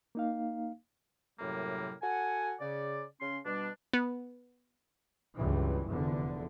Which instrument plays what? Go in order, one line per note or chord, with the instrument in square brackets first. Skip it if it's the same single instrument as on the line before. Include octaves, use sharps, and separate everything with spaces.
[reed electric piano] A#3 D#4 F5
[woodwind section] F#2 A2 C3 F#3 G3 A#3
F#4 A4 F#5 G#5
C#3 D5
C#3 C#4 C6
B2 G3 D4
[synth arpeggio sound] B3
[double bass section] C#2 G2 E3
F1 E2 D3